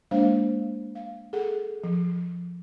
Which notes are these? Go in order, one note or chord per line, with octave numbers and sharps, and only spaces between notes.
G#3 A#3 D4 C5 F5
F5
G#4 A4 F#5
F3